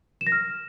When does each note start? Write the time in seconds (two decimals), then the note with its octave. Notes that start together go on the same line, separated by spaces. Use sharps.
0.21 E7
0.27 A#6
0.32 F6